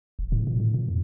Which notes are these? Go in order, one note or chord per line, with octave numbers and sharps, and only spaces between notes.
D#1
A2
A#2
A2
A#2
F2